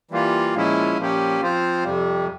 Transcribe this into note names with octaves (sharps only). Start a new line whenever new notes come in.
E3 G3 A#3 F4
A#2 F3 G#3 C#4 E4
A#2 F3 A#3 C#4 G4
F3 C4 F4 C5
F2 C3 G3